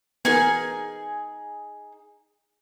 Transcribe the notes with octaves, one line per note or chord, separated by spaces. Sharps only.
B3 D#4 G#4 A#4 G#5